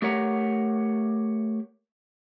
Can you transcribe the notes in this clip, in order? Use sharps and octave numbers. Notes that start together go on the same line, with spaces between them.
A3 G4 A#4 C#5 F#5 A#5